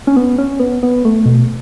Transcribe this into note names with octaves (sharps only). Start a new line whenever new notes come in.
C#4
B3
C#4
B3
B3
A3
B2